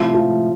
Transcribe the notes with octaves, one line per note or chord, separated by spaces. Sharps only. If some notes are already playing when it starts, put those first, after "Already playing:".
Already playing: A2 C3 F3
F3